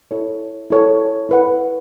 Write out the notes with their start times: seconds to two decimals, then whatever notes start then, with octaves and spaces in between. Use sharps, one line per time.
0.11 E4 A4 C#5
0.70 E4 A4 C#5
1.29 E4 B4 F#5